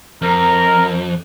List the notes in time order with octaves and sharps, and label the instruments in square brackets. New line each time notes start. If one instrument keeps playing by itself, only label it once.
[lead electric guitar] F2 [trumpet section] A#4